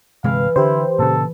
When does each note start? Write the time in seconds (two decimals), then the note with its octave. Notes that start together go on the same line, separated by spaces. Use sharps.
0.24 G1 C3 E3 G#3 F5
0.56 D3 E4 G4 C5
0.99 A#2 C#3 A4